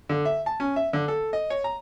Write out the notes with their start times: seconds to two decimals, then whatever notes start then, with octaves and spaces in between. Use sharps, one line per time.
0.09 D3
0.25 E5
0.46 A5
0.60 C#4
0.76 E5
0.93 D3
1.08 A4
1.33 D#5
1.50 C#5
1.64 A#5